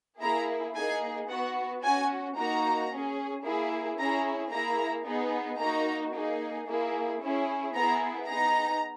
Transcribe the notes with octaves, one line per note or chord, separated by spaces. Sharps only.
A#3 E4 G#4 A#5
A#3 D#4 G#4 G#5
B3 F#4 F#5
C#4 F#4 G#5
A#3 D#4 F#4 A#5
C#4 G#4
A#3 E4 G#4
C#4 E4 G#4 A#5
A#3 E4 G#4 A#5
B3 D#4 G#4
A#3 D#4 F#4 A#5
A#3 D#4 G#4
A#3 E4 G#4
C#4 E4 G#4
B3 E4 G#4 A#5
B3 D#4 G#4 A#5